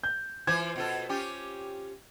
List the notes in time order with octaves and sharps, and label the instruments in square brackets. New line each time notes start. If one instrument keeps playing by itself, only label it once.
[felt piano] G6
[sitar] E3 F4 C5 [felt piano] G#6
[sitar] B2 F4 A4
C#4 F4 G4